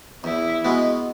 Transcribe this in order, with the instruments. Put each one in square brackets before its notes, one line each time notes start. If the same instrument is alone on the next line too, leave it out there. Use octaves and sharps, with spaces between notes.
[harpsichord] E2 [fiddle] E4
[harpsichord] B2 G#3 B3